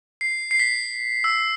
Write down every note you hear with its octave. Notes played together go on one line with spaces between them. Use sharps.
C7
C7
B6
E6